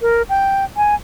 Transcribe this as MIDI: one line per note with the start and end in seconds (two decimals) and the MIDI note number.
0.01 0.22 70
0.29 0.65 79
0.77 0.95 80